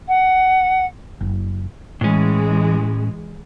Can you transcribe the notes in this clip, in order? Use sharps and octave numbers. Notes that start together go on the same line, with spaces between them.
F#5
F#1
A2 E3 G#3 C#4